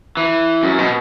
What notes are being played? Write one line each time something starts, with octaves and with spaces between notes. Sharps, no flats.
E3
F#2
B2